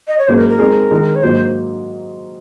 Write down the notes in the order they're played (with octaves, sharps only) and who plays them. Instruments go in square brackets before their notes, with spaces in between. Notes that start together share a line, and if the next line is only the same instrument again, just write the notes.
[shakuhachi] D#5
C#5
[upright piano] G#2 F#3 A#3 C#4 G#4 [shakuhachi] C5
[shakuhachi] A#4
A#4
[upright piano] G#3 C4 D#4 G#4
D#3 G#3 D#4
[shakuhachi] C#5
[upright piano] G#2 F#3 A#3 [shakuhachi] C5